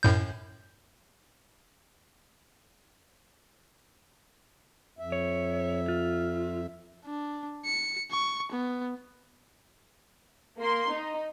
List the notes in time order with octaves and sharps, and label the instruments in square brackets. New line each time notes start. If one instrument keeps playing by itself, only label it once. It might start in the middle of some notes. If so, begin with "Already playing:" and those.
[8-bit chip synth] F#2 A2 G6
[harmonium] F2 E5
[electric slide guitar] C#5
F4
[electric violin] D4
C#7
C#6
B3
[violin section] A#3 C6
D#4